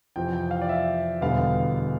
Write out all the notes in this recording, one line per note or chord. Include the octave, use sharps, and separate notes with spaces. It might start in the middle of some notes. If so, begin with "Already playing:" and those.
F2 C3 E3 G5
G5
F5
D5
E5
E1 E2 D3 G3 B3 F5